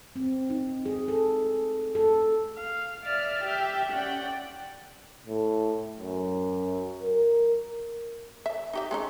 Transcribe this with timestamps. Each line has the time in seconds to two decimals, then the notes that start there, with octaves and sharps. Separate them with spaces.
0.16 C4
0.50 D#4
0.85 G#4
1.08 A4
1.95 A4
2.57 F5
3.05 D5 E5 F6
3.43 G4 E5
3.91 C#4 D5 F#5 G5
5.26 A2
5.99 F#2
7.03 A#4
8.46 E5
8.73 D#4 G4 E5
8.91 G#3 C#4 D#4